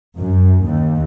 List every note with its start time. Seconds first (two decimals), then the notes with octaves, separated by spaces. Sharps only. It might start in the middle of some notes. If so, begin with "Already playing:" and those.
0.17 F#2
0.63 D#2